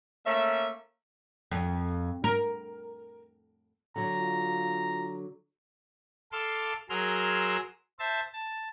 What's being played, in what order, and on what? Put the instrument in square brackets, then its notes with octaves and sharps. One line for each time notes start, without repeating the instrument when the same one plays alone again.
[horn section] A3 A#3 C#4 E5
[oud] F2
A#4
[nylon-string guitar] D3 F#3 [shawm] A#5
[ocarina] F4
[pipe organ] A4 F5 A5 C6 D6
F#3 G#4 A#4 C6 E6 F6
C5 E5 A5
A5